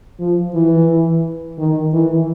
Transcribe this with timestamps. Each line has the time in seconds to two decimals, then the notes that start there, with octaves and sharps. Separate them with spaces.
0.19 F3
0.54 E3
1.58 D#3
1.93 E3